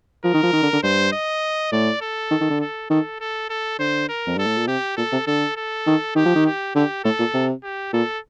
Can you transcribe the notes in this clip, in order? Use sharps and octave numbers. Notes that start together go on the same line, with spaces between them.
F3 A#4
D#3
F3
D#3
D3
D3
G2 C5
D#5
A2 D5
A4
D#3
D#3
D3
A4
D#3 A4
A4
A4
D3 C5
A#4
F2
G2 A4
A2
A#2
C3 G4
A#2 A4
C3
D3 A4
A4
D#3
D#3 G4
F3
D#3
G4
D3 G4
A2 A4
A#2
C3
G4
A#2 A4